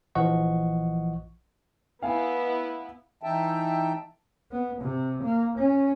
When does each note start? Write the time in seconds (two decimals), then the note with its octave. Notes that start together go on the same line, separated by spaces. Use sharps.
0.15 A#1 E3 F3 D#5 F#5 C#6
2.03 B3 E4 F5 G#5
3.23 E3 D#4 E5 G5 A5
4.51 B3
4.81 C3
5.23 A#3
5.57 C#4